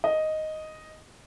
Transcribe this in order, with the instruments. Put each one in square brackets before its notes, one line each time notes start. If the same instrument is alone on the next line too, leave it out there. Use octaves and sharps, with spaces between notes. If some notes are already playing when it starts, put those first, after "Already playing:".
[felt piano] D#5